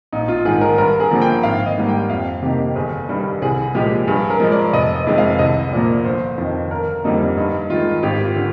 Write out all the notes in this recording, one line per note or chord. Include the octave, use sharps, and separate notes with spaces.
A#1 D#4
F4
G#2 D#3 G#4
A#4
G2 A#4
G#4
D3 F3 A#3
G5
G#1 F5
D#5
G#2 G3 A#3
G5
F2 F5
C3 D#3 A#3 G4
G1 G#4
G2 D#3 G3
C2 G#4
A#2 F3 G#3 G4
G2 G#4
A#4
F3 G#3
D5
F1 D#5
D#5
F2 D#3 G#3
F5
C2 D#5
A#2 F3 A#3 D5
G1 C5
F2 D#3
G1 A#4
F2 D3 G3 A#3 D#4
G2 D#4
D#3 G#3 F4
G#1 G4
F4
D3